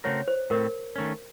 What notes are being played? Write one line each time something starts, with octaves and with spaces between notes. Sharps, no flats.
C#3 A3 C4 F#4 A#4 C#5
C5
A2 A3 C4 A#4
D#3 A3 C#4